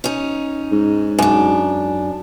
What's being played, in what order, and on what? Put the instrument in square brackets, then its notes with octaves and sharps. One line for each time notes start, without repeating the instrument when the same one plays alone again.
[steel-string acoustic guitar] C#4 D#4
[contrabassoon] G#2
[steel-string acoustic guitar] F#2 D4